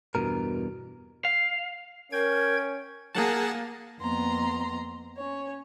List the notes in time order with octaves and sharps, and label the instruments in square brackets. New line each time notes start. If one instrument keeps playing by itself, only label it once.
[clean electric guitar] E2 G2 B2 A#4
[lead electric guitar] F5
[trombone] C#4 [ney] A#4 [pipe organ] G5 G#6
[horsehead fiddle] A#3 [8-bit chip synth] G#4 F#5 A5
[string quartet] F2 A#3 B3 A#5 C6
C#4 C#5